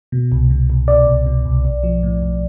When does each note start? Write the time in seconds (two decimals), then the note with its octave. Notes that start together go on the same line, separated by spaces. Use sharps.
0.12 B2
0.32 C2
0.50 B2
0.70 C2
0.88 B2 D5
1.07 C2
1.26 B2
1.45 C2
1.65 B1
1.83 F3
2.03 A2
2.22 B1